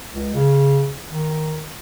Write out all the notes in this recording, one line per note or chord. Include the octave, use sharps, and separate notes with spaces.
C#2
C#3
D#3